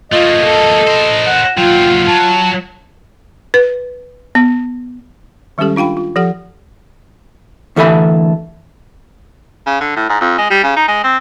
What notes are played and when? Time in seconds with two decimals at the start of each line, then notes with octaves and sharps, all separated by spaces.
0.12 A3 A#3 F4 D#5
0.43 A4
0.87 A#4 C5
1.26 F#5
1.58 D#2 F#3 F4 G5
2.08 F#3 A5
3.54 B4
4.35 B3
5.58 D#3 G3 G#3 C#4 G4 A4
5.76 D4 F4 F5 G5 B5
5.97 F4
6.16 F3 G4 A4 F#5
7.76 D2 E3 A4 E5 G#5 B5
9.67 C#3
9.81 D3
9.96 A2
10.09 G#2
10.21 F2
10.38 G#3
10.51 G3
10.64 C#3
10.76 D#4
10.88 G#3
11.04 C4